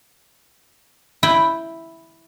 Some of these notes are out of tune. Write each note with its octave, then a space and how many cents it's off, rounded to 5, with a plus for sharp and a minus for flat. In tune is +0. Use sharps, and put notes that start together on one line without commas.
E4 +0 G5 +0